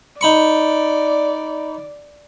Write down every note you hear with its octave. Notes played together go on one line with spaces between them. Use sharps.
D#4 D5 B5 C#6